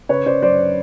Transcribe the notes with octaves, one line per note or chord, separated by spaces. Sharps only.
C#3 B4 C#5
C#3 C5 D5
F#2 C5 D5